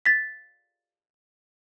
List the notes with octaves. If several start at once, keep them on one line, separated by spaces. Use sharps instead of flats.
A6 B6